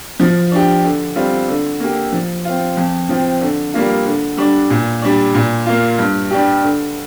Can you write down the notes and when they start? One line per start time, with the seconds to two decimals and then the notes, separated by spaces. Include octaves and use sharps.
0.19 F3
0.52 D4 G4
0.84 D3
1.16 G3 C4 F4
1.48 D3
1.80 A#3 G4
2.12 F3
2.45 C4 F4
2.77 F2
3.09 F3 C4
3.41 D3
3.74 G3 A#3 F4
4.06 D3
4.37 G3 D4
4.70 A#2
5.02 G3 D4
5.34 A#2
5.66 A#3 F4
5.99 G2
6.31 G3 D4 G4
6.62 D3